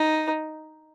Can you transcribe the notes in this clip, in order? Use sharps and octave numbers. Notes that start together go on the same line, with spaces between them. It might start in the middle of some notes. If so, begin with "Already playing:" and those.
Already playing: D#4